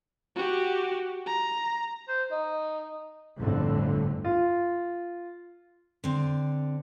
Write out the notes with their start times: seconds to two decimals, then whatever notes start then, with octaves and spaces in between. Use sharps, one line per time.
0.36 F#4 G4
1.26 A#5
2.08 C5
2.31 D#4
3.37 G1 F2 A2 D3
4.24 F4
6.04 D3 C4 D5